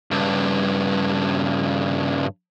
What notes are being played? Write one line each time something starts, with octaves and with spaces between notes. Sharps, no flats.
G2 C#3